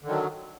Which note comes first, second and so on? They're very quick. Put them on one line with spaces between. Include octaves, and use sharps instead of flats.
D3 D#3 F#3